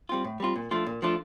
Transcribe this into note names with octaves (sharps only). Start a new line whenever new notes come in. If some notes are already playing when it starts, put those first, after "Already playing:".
G3 C4 F4
A2
G3 C4 F4
A#2
F3 A3 D4 F4
A#2
F3 A3 D4 F4